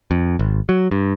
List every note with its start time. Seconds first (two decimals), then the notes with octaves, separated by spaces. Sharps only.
0.11 F2
0.39 G#1
0.69 F#3
0.91 G2